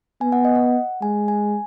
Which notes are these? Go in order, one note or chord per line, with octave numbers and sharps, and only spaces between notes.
B3 G#5
F#5
D#5
F#5
G#3 G#5
G#5